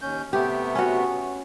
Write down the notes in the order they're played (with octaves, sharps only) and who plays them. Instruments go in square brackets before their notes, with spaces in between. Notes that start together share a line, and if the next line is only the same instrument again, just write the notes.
[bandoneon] D#2 C#4 G6
[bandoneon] C3 A3 B3 [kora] G4
[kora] C#4 F#4